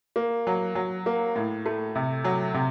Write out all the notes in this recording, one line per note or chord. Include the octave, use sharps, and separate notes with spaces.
A#3
F#3
F#3
A#3
A2
A3
C3
F#3
C3